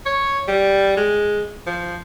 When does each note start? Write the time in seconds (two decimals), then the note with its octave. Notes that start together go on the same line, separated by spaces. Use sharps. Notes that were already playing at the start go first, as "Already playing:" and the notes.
0.06 C#5
0.48 G3
0.97 G#3
1.67 F3